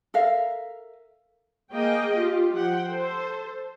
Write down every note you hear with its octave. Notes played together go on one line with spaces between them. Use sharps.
A4 A#4 E5 F5
A#3 G#4 D#5 G5
F4 G4
F3 F#5 G5
A4 C5